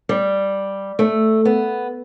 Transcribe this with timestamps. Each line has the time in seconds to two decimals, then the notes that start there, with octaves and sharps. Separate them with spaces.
0.09 G3
0.99 A3
1.45 B3